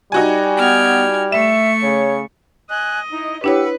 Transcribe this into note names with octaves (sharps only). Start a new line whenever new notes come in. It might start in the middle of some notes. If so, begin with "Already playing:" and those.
G3 D#4 F#4 G#5
B3 G5 F6 G#6
A3 E5 C#6 E7
C#3 C#5
D#5 G#5 F#6
D#4 E4
D4 E4 G4 B4 C#5 F#5 E6